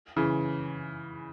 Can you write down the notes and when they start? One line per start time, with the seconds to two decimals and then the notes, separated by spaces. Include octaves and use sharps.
0.16 C#3 E3